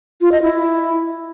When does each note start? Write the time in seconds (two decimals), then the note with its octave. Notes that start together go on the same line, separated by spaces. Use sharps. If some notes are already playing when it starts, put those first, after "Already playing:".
0.21 F4
0.32 D#5
0.42 E4